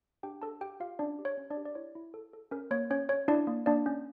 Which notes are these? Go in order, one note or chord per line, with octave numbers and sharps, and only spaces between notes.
D4 G4 G5
D4 A4 A5
G4 G5
F4 G4 F5
C#4 D4 D5
G4
C#5
C#4
D4 D5
G4
D5
E4 C#5
E4
A4
A4
C#4 A#4
A#3 C#5
C#4 C#5
C#4 C#5
D4 E4 D5
A#3
A#3 D4 D5
C#4